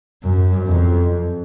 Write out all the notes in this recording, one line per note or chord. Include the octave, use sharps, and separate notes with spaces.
F#2
F2